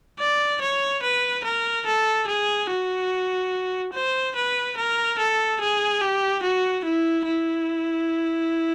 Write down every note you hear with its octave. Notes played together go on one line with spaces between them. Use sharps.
D5
C#5
B4
A#4
A4
G#4
F#4
C5
B4
A#4
A4
G#4
G4
F#4
E4
E4